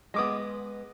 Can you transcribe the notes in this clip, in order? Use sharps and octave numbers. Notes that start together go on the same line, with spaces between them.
G#3 B3 D#5 D6 D#6